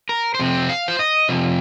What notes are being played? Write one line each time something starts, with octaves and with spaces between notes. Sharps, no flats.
A#4
C5
F2 C3 C4
F5
C5
D#5
F2 C3